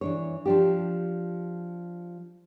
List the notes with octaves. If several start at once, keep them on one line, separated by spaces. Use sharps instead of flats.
E3 D4 C#5
F3 D4 G4